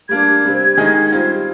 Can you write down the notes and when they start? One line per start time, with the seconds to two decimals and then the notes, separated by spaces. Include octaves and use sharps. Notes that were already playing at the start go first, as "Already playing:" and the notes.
0.09 G3 A#3 D4 G#6
0.44 C3 G3 C4
0.77 D#3 G#3 D#4 G#4 D#5
1.12 G3 C4 F4